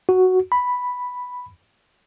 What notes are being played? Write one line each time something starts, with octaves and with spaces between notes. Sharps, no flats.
F#4
B5